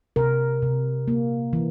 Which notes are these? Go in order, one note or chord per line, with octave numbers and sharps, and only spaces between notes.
C3 A#4
C3
A#3
E3